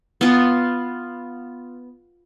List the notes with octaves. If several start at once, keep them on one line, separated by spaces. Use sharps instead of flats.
B3 F4